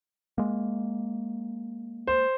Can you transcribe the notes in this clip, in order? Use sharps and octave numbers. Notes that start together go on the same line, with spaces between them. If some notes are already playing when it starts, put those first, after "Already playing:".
G#3 A#3
C5